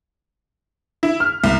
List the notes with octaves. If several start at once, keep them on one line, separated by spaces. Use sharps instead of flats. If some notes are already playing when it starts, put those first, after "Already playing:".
E4
F6
C2